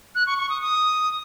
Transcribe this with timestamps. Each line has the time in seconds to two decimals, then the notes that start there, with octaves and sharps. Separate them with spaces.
0.15 F#6
0.27 C#6
0.38 C#6
0.49 D#6
0.61 D#6